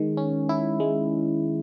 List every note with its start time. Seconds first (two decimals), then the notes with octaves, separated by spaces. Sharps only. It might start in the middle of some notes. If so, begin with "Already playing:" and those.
Already playing: D#3 G#3
0.17 C#4
0.49 E4
0.80 G#3